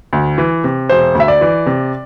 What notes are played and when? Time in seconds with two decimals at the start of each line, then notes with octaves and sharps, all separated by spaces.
0.13 D2
0.38 E3
0.64 C3
0.89 E1 C5
1.15 D2
1.20 E5
1.28 D5
1.41 E3
1.66 C3